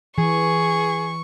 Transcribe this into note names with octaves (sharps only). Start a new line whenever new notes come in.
E3 G#4 C#6